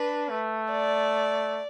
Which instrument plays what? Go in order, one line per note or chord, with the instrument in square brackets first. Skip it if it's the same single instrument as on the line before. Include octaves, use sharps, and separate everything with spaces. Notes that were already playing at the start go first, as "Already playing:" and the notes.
Already playing: [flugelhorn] D4 [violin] B4
[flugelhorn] A3
[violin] D5